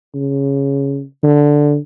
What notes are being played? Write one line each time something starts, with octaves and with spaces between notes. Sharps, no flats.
C#3
D3